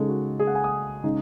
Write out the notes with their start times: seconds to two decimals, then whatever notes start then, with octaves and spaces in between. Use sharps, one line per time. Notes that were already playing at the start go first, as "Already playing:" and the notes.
Already playing: C#3 G#3 D#4 G#4 A4
0.08 F#4
0.39 G#4
0.47 F#5
0.55 G#5
0.64 D#6
1.04 C#3 G#3 D#4